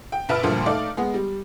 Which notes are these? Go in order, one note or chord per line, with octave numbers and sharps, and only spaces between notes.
G5
A#1 B4 E5 A5 F6 D7
D2 G2 A#2 F3
A3 D#4 D5 F5
G#3 B3
G3